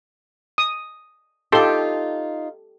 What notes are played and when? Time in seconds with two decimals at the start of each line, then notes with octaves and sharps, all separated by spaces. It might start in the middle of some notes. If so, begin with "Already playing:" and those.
0.58 D#6
1.52 D#4 F4 G4 A4 C6